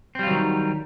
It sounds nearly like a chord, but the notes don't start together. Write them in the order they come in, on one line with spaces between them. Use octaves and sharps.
C4 G3 F4 F#3 D#3